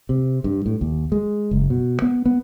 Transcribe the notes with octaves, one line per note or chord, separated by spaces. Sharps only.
C3
G2
A2
D#2
G#3
F#1
B2
B3
B3